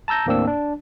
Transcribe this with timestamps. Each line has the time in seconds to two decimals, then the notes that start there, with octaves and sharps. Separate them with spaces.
0.08 A5 A#5 E6 G6 A#6
0.26 D#2 A2 A#3 C4 D4 E6
0.48 D4